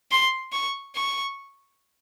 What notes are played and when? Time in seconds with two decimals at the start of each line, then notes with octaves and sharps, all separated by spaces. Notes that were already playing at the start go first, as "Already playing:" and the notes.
0.11 C6
0.53 C#6
0.96 C#6